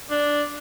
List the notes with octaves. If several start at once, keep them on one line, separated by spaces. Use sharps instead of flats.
D4